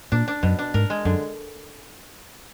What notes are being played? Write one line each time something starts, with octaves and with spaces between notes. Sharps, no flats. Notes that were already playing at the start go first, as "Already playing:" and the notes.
A#2 D4
D4
F#2 B2
D4
G#2 A#4
G#3
F#2 D3